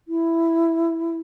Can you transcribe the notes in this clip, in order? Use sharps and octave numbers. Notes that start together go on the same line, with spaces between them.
E4